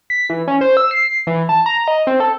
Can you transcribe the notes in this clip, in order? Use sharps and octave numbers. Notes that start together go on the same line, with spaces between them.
B6
E3
C#4
C5
E6
C7
E3
A5
A#5
D#5
C4
A4